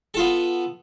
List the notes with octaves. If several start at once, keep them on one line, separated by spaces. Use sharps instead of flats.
B3 F4 A4